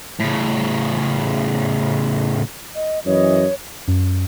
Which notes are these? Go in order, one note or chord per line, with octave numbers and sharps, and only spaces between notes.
A2 C#3
D#5
F#2 E3 C#5 D#5
F#2